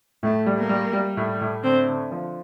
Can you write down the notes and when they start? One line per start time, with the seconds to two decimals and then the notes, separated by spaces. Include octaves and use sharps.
0.23 A2 A3
0.46 G3
0.58 A#3
0.69 G3
0.93 G3
1.17 A2
1.41 A2
1.63 D3 C4
1.88 D3
2.12 F3